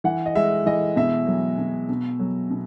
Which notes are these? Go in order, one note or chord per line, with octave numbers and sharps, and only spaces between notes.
E3 F#5
D#5
G#3 E5
E3 D#5
B2 E5
F#3
B2
B2
F#3
B2